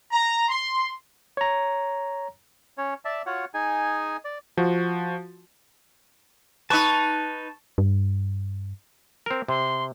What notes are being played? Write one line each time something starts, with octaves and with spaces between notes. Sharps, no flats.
A#5
C6
C#5 A#5
C#4 C#5
D5 E5 A5
F4 F#4 C#5 F#5
D#4 G#4 G#5
D5
F3 F#4
D#4 B4 A5 C#6
G2
C4 A#4
C3 C6